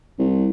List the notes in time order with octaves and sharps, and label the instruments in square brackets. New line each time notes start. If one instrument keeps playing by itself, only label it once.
[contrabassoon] C2